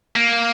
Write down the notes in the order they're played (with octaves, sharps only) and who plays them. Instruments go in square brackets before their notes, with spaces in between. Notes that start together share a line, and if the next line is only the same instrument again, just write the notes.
[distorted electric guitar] A#3